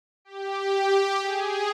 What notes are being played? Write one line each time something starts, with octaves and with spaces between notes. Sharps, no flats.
G4
G#4